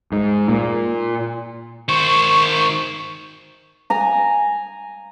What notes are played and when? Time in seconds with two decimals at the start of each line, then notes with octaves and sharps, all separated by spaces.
0.12 G#2
0.49 A#2
1.89 D#3 C5 C#6
3.90 G#5 A#5